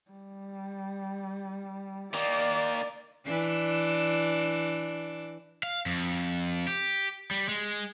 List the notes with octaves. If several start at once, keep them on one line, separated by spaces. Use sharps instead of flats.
G3
D#3 A#3 D5
E3 D4
F5
F2
G4
G3
G#3